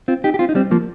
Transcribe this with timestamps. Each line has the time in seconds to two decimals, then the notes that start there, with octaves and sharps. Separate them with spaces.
0.08 C4 F4
0.24 D#4 G4
0.34 G4
0.39 C4 F4
0.49 D#4
0.55 G3 C4
0.71 F3 A#3